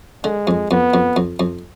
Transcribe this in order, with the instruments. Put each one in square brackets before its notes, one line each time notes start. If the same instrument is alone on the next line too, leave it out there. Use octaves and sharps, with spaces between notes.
[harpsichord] D3 [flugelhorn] G#3
[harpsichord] F2
[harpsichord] F2 [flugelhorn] B3
[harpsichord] F2
F2
F2